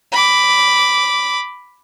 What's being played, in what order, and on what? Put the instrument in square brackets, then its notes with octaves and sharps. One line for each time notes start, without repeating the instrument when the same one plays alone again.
[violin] B5 D6